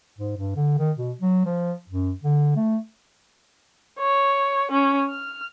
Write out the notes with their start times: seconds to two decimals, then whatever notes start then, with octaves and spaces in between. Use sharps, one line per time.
0.18 G#2
0.37 G2
0.56 D3
0.79 D#3
0.97 B2
1.20 F#3
1.45 F3
1.89 F#2
2.23 D3
2.56 A3
3.99 C#5
4.71 C#4
5.09 F6